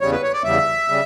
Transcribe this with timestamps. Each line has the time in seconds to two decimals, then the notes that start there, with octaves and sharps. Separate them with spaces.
0.01 E2 C#3 G3 C#5
0.12 B4
0.23 C#5
0.33 D5
0.44 E2 C#3 G3 E5
0.89 C#3 G3